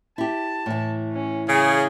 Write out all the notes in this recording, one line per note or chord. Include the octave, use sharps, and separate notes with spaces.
E4 G4 A5
A2 E3
C#4
C#3 G#4